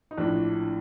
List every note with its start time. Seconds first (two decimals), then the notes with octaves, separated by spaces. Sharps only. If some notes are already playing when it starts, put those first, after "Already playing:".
0.11 D#4
0.18 A#1 A2 F3 D4